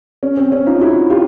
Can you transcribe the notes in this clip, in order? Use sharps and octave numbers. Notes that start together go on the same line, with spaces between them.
C#4
C4
C#4
D#4 F4
E4 F#4
F4 G4